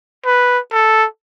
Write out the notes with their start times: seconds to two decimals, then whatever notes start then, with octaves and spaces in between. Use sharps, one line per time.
0.26 B4
0.73 A4